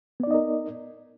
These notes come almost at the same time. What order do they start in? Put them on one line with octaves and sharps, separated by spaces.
B3 D5 D#4 D#5 A#4